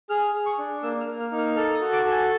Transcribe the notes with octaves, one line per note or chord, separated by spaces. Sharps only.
G#4 F6
F6
G#4
C#6
D4
A#3 E6
F6
A#3
F6
D#4
F6
A4 F6
D#6
F#4
D6
A4
G#5